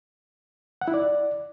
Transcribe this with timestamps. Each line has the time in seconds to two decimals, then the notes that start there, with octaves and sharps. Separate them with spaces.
0.81 F#5
0.88 E4
0.94 D5